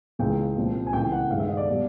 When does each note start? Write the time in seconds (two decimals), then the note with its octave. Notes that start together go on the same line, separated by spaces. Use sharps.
0.19 C#2 C#3 E3 G#3 G5
0.56 C2 A#2 F3
0.87 G#5
0.93 C#2 C#3 E3 G5
1.12 F#5
1.30 G2 D#3 G#3 F5
1.39 E5
1.49 D#5
1.57 D5
1.68 B2 G3